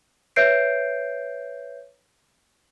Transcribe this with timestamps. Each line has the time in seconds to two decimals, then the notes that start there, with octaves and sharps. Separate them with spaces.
0.36 B4 C#5 E5 G6 C7 D7